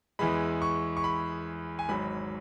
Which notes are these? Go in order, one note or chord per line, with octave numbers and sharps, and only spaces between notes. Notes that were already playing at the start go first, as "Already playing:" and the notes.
E2 E3 G#3 B5
C#6
C#6
B5
G#5
G#1 G#2 F#3 B5